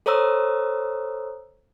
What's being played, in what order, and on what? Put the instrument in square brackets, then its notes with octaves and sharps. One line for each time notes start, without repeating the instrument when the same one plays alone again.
[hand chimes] A4 C5 C#5 A#5 D#6 E6